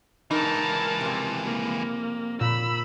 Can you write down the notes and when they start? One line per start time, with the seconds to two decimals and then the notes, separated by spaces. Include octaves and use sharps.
0.31 C#2 E3 D#4 A#4 A5
1.01 F2 C3
1.45 A#3
2.40 A#2 B5 E6